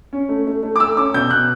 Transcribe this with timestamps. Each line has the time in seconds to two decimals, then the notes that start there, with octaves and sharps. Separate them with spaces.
0.13 C#4
0.29 A3
0.47 A3
0.63 A3
0.76 D6
0.80 A3 E6
0.97 C#4 D6
1.14 B2 G6
1.31 B2 F#6